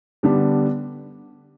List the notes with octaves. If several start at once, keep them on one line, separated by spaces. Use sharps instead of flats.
D3 G3 B3 D4